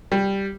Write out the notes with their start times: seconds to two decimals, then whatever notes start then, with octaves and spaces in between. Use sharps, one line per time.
0.12 G3